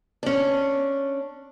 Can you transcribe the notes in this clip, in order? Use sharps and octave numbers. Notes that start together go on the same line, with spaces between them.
C#4 D4